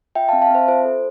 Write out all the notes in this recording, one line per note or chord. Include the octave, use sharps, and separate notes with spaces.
F4 E5 G5
F5 A5
C4
F5 A5
C4 C5 E5
F4 C5
A4